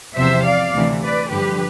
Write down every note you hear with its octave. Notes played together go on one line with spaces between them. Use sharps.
E2 C3 F3 C5 E5
D5 F5
D2 C3 E3
B4 D5
G2 D3 F3 G4 B4